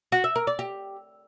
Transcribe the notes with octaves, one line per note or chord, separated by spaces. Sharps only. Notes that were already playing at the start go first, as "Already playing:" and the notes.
F#4
E5
A#4
D5
G4